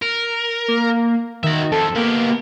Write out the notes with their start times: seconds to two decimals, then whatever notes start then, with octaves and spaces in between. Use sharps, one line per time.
0.02 A#4
0.68 A#3
1.43 D#3 F#4 E5
1.72 F2 A4
1.96 A#3 B3 G4